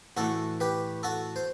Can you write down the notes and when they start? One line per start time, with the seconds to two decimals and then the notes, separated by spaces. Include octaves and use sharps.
0.17 A2 E3 A3 F#4 A4
0.60 G4 B4
1.03 F#4 A4
1.36 C5